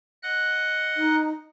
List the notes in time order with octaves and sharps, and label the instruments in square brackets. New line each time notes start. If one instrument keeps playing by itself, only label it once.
[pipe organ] D#5 F#5 F#6
[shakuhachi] D#4